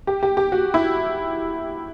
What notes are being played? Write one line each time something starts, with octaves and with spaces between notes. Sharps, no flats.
G4
G4
G4
F#4
E4